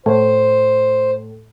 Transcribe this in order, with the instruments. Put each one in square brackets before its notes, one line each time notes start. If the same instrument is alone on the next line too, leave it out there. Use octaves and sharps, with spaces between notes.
[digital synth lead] A2 [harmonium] C5